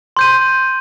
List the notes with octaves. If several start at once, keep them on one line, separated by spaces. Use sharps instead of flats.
C6 G6 D#7